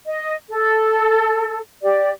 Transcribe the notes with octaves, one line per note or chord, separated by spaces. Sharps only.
D#5
A4
G4 D5